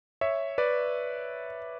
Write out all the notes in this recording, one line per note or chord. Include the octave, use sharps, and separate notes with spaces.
C#5 E5
B4 D5